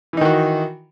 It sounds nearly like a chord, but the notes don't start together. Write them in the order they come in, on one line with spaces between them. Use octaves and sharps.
E3 D#4 D#3 F#4